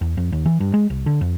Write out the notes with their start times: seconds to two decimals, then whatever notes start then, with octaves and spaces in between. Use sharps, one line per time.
0.01 E2
0.17 F2
0.32 D#2
0.45 E3
0.60 G2
0.74 G#3
0.90 C2
1.06 D3
1.21 F2